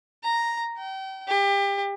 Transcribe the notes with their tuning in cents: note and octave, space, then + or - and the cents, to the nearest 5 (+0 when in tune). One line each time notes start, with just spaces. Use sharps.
A#5 +0
G5 -35
G4 +30